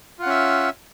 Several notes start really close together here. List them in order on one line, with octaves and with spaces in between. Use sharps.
F4 F#5 C#4 E5